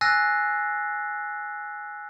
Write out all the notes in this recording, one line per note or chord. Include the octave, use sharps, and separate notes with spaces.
G#5 E6 F#6 A6 A#6 C7